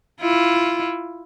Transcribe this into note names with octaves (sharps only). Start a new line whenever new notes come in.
E4 F4